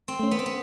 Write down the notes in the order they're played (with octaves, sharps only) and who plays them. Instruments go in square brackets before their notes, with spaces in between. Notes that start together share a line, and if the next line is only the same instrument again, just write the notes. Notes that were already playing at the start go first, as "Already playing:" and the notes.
[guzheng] C4
[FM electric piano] A3 C#4
[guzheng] B3
C4
B3